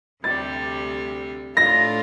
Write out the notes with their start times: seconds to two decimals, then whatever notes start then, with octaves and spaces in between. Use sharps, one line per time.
0.24 D2 C3 G3 A6
1.57 A2 A3 D4 F4 A#6